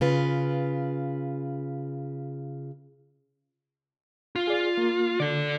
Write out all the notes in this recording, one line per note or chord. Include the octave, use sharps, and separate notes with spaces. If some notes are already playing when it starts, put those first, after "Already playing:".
C#3 F4 B4
F4
G#4 D5
A#3
D3 A4 D5